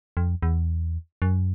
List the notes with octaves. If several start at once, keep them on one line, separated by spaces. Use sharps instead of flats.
F2
E2
F#2